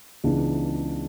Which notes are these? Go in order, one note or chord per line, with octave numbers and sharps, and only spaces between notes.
C#2 C#3 E3 B3 D4